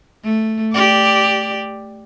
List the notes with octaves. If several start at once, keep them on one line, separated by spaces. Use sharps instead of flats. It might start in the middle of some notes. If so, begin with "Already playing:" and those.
A3
G4 D5